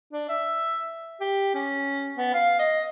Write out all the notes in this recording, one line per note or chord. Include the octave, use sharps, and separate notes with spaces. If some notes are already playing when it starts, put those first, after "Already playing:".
D4
E5
G4
C#4
B3
F5
D#5